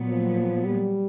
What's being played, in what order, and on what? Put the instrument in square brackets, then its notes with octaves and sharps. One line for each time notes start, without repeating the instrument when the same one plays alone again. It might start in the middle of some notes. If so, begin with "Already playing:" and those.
Already playing: [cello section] A#2 F#3 B3
[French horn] F3
G3